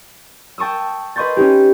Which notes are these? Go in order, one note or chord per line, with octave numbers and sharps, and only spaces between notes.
G5 A5 C#6 D#6 E6
B4 D#5 C6 C#6 G6 A6
C#4 D#4 G4